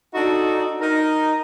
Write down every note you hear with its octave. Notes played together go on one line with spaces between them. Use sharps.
D4 D#4 F#4 A4
D#4 A#4